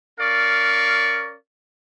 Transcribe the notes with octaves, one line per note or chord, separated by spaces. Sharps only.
C#4 A#4 D5 F5 C#6